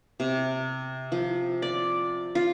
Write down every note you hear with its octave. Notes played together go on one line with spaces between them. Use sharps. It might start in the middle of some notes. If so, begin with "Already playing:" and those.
C3
F3
D5
F4